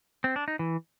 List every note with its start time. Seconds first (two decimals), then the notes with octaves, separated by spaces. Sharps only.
0.24 C4
0.36 D4
0.48 D#4
0.59 E3